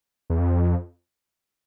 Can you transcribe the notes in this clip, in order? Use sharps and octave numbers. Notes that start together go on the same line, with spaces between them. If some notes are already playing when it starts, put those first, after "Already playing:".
E2
F2